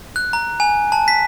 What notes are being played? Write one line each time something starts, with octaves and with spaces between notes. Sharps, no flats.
F#6
A#5
G#5
A5
B6